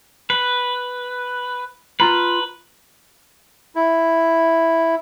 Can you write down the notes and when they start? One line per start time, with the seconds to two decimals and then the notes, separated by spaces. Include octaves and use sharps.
0.30 B4
2.00 F4 B4 A#5
3.75 E4